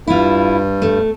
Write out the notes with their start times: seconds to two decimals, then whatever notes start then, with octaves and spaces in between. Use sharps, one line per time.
0.07 G2 E4 F4
0.82 A3